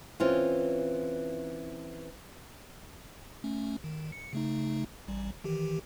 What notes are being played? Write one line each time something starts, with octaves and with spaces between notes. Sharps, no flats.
E3 C4 C#4 F4
A3 C#4
D#3
C#7
C#3 A3 D#4
A1 G3
D#3 E3 G4